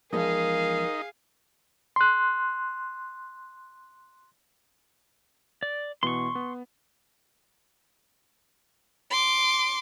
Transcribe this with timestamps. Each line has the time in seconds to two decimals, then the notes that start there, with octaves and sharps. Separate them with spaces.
0.13 E2 F3 G#3 D#4 G#4 A#4 F5
1.96 C6 F#6
5.63 D5
6.03 B2 E3 B3 C6 C#6
6.35 B3
9.10 C6 D6